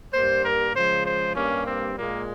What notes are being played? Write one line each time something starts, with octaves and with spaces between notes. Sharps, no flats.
G2 G3 A#3 C5
A#4
C#3 F3 G#3 C5
C5
G2 G3 A#3 C#4
C4
A#2 G#3 A#3